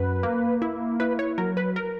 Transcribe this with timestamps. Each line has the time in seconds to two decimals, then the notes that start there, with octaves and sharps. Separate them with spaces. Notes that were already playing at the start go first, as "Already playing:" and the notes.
Already playing: F#2 B4
0.23 A#3
0.62 E4
1.00 E4 B4
1.19 C#5
1.38 F#3 A#4
1.57 B4
1.76 A#4